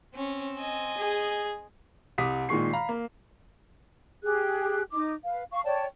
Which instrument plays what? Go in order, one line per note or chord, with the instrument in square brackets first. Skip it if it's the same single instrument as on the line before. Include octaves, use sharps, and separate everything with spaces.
[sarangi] C4 [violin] C#4
[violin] D#5 G#5
[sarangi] G#4
[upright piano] C2 D6 D#6 B6
A#2 D#3 G#3 C#6 C7
F5 A#5 B5
A#3
[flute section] G4 G#4 F#6
D#4 D6
B4 F5
F5 C#6
C#5 D5 G5 A5